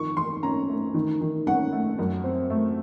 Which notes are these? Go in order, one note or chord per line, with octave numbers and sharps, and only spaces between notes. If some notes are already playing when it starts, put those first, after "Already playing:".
Already playing: D#3 F3 C4 C#6
D#3 C6
C#4 A#5
A3
D#3
D#3
C#4 F#5
A3
F#2
C4
A3